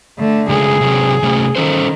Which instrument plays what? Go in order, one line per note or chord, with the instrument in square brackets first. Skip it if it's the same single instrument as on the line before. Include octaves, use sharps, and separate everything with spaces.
[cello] D3 A3
[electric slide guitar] C#3 G#3 A3 [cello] G#4
[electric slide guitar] C3 F#3 C4
C3 A3 C#4
[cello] D#3 [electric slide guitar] C#4 A4 C5